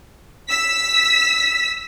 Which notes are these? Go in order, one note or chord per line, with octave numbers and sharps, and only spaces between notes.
E6 B6